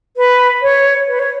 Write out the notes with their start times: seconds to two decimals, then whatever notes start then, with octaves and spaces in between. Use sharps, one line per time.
0.16 B4
0.62 C#5
1.07 B4
1.19 C#5